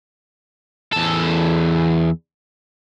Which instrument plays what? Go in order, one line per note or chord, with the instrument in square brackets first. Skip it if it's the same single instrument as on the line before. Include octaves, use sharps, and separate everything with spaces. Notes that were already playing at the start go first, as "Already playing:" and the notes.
[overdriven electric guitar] E2 A4